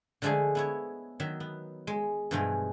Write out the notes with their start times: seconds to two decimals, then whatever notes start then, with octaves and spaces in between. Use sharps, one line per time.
0.22 D3 F3 G#3 A3 D4 G#4
0.55 B3 E4 C#5
1.20 D#3 F#3 E5
1.40 B3
1.87 G#3
2.31 G2 B2 E3 F3 G#3